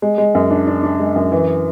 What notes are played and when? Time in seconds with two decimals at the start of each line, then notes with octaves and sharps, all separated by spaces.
0.02 G#3
0.18 G#3
0.35 F#2
0.50 D4
0.67 D4
0.83 D4
0.99 G#3
1.16 F#2
1.32 E3